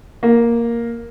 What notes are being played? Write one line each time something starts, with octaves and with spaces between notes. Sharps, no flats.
A#3